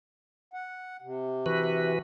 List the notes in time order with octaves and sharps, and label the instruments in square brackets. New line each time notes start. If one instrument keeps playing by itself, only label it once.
[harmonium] F#5
C3
[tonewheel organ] E3 F#4 B4